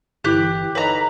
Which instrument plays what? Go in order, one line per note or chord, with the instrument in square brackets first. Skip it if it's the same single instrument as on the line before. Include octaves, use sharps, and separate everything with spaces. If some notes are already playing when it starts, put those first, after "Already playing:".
[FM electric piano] G1 E3 B4 [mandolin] G4 F#6
[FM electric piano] D#4 A4 C#5 [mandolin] B4 A#5